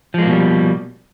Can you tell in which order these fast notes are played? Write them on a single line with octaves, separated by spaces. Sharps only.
F3 G#3 A#3 B2 G3